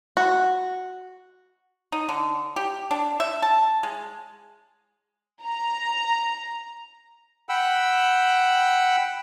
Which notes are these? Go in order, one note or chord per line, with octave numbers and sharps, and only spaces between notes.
F#4
D#4
D3
G4
D4
E5
A5
G#3
A#5
F#5 G5 B5 E6